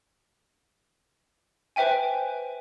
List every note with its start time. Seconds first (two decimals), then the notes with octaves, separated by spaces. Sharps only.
1.76 B4 C5 E5 G5 G#5